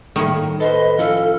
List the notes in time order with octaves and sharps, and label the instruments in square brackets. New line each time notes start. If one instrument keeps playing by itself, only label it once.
[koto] A2 D#3 [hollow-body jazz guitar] G3 A#3 D#4
[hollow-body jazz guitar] A4 C5 [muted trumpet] B4 [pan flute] D#5
[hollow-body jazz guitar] F3 C#4 E4 [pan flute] A4 [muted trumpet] F5